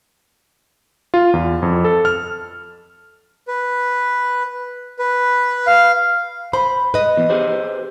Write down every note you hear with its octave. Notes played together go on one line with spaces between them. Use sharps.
F4
E2
F2
A4
F6
B4
B4
F5
C5 B5
B4 D#5
E2
G4 G#4 C5